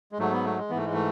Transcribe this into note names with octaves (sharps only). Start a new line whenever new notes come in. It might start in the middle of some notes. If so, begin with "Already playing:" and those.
G#3
G#2 F#3 A3
B3
A3
G#3
G#2 E3 A3 B3
G#3
A3